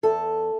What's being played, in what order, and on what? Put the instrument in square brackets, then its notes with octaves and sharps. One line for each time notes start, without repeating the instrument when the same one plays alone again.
[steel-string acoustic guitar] E2 A4